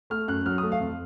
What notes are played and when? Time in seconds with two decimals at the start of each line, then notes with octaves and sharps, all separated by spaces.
0.10 A3 F6
0.28 F#2 F#6
0.46 F#3 F6
0.58 D#6
0.63 A3
0.72 F5
0.80 F2